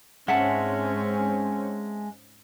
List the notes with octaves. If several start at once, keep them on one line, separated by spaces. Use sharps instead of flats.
G#2 G#3 C4 C#4 E5 F#5 A5